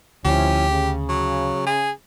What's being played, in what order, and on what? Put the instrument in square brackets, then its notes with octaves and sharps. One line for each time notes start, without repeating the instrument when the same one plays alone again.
[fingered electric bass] D2 [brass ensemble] F3 C#4 E4 [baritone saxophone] G4
[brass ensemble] C#3
[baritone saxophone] F#3
G#4